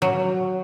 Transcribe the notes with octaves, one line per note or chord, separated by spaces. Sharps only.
F#3